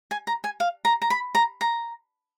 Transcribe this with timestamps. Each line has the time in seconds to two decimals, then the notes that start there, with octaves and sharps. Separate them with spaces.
0.11 G#5
0.27 A#5
0.44 G#5
0.60 F5
0.85 A#5
1.02 A#5
1.10 B5
1.35 A#5
1.61 A#5